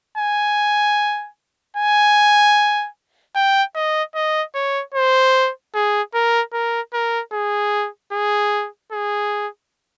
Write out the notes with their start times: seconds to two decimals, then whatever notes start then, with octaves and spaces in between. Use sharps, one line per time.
0.18 G#5
1.77 G#5
3.35 G5
3.75 D#5
4.15 D#5
4.55 C#5
4.95 C5
5.74 G#4
6.14 A#4
6.53 A#4
6.93 A#4
7.33 G#4
8.12 G#4
8.92 G#4